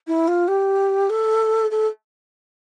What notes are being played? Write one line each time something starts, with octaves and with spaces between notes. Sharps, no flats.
E4
F4
G4
A4
A4